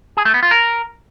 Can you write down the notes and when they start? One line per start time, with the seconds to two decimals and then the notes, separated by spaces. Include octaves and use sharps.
0.17 G#4
0.25 A3
0.34 B3
0.43 F4
0.51 A#4